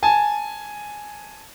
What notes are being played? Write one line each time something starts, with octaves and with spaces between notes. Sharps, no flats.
G#5 A5